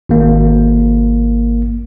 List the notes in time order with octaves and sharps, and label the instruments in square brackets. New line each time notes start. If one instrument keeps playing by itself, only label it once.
[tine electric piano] G#1 A#3